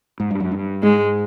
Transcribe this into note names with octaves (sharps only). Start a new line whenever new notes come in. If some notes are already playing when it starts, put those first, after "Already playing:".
G#2
G2
F#2
G2
G#2 G#3